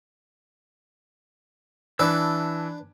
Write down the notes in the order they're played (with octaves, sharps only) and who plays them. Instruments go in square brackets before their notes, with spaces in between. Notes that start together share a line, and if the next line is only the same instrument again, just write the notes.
[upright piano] E3 [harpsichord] D4 B4 [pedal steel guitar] A5 E6